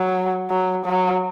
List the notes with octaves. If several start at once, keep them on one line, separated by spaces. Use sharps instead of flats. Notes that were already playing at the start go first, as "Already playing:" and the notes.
Already playing: F#3
F#3
F#3